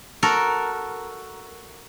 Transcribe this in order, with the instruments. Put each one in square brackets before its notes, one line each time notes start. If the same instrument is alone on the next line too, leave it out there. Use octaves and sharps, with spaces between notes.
[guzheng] F#4 A4 A#4